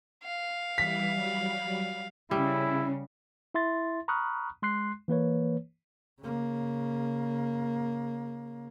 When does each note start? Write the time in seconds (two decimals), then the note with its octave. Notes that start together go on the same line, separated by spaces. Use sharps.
0.24 F5
0.78 E3 G3 E4 B6
1.14 F#3 G3 B5
2.31 C#3 G3 E4
3.54 E4 E5 C6 A6
4.08 A#5 B5 C#6 D#6 F6 F#6
4.62 G#3 C6 F#6 C7
5.08 E3 A#3 B4 C#5
6.21 C#3 A#3